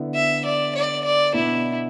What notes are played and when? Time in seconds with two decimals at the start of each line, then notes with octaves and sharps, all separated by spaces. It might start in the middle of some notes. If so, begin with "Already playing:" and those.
Already playing: D3 B3 E4
0.15 E5
0.45 D5
0.75 D5
1.05 D5
1.34 B2 B3 D4 E4